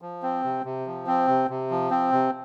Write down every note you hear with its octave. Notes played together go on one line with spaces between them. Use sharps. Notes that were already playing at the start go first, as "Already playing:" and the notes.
F3
C4
C3
C3
F3
C4
C3
C3
F3
C4
C3